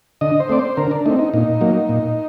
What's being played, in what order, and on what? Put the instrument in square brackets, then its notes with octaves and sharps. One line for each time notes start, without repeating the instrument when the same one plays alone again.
[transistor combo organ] D3 D#5
C5
A3 C4 D5
C5
D3 A#4
D4
A3 C4 D#4
D#4
A#2 D#4
F#3 A#3
A#2